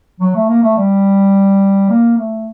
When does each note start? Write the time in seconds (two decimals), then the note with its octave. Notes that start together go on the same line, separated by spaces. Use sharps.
0.20 F#3
0.35 A3
0.48 A#3
0.63 A3
0.77 G3
1.90 A#3
2.18 A3